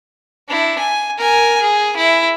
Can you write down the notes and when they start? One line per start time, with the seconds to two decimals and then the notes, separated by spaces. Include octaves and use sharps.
0.48 D4 E4
0.79 G#5
1.18 A#4 G#5
1.61 G#4
1.96 E4